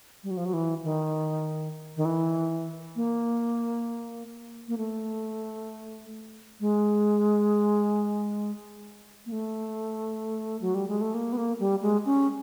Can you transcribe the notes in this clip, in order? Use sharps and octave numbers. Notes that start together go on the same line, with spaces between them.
G3
F#3
F3
F#3
E3
D#3
D#3
E3
A#3
A#3
A3
G#3
A#3
A3
F#3
G3
G#3
A3
A#3
B3
A#3
G3
G#3
C#4